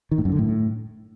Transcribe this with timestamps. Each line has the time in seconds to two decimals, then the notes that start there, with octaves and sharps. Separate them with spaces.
0.11 D#3
0.18 A2
0.25 F#2
0.32 D3
0.39 A2